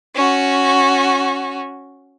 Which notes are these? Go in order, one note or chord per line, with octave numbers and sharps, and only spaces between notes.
C#4 F#4